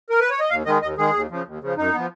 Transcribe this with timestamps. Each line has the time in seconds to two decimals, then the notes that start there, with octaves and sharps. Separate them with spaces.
0.10 A#4
0.20 B4
0.30 C#5
0.40 D#5
0.50 D#2 F5
0.66 D#3 G#3 D#5
0.82 D#2 D#5
0.98 D#3 G#3 G#4
1.14 D#2
1.30 C#3 F3
1.46 D#2
1.61 C#3 F3
1.77 F#2 D#4
1.93 F3 B3